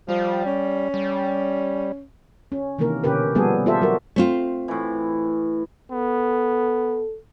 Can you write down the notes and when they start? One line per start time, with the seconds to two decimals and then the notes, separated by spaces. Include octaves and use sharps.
0.08 F3 G3
0.46 C#4
0.94 G3
2.52 C#4
2.79 C3 D#3 E3 A#3 A#4
3.04 B2 D3 C#4 G4 A#4 B4
3.35 F3 G3 A#3 B3 G#4 A4
3.66 F4 G4 A4 C5 E5
3.82 F#3 F#4 A#4
4.16 A3 C4 F4
4.68 A2 E3
5.91 B3 A4